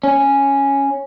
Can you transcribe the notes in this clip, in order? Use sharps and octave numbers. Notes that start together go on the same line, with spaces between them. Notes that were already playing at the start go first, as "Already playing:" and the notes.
C#4